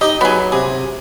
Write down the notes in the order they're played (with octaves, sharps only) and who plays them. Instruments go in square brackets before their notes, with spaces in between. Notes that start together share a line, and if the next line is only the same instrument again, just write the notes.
[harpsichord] D#4 G4 [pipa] D#5
[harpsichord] F#3 [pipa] B3 G#4
[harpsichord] C3 [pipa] G#4